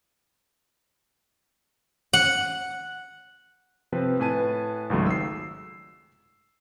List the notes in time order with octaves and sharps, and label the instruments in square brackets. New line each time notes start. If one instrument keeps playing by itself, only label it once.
[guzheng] F#5
[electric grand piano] C3 F3 C4 B4
A2 B4 G#5 A5 D#7
G#1 C#2 F#3 A3
E6 C7